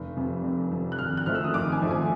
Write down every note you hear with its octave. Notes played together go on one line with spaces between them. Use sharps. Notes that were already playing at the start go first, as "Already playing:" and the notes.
Already playing: F1
F2 C3
F1
F2 C3
F#6
G#1 F6
F#6
G#2 F3 A3 F6
E6
D#6
G#1 D6
G#5
G#2 F3 A3
G#5